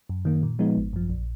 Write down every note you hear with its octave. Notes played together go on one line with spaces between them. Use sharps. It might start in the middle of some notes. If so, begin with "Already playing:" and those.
F#2
D#3 A#3
A#2
F3 G#3 B3 D#4
G#1
F#2 F3
A#1